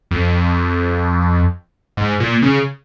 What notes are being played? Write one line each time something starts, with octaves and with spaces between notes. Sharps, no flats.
F2
G#2
A#2
C#3